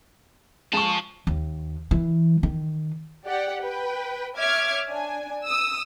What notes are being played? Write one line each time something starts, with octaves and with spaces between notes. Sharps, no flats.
F3 G#3 A5 C#6
D#2
E3
D#3
G4 D5 F#5 G5
B4 G5
C#5 E5 D6 F6 G#6
D4 G#5
D#6 E6